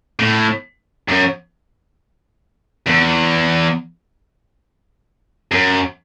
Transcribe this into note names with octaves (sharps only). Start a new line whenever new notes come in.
A2
F#2
E2
F#2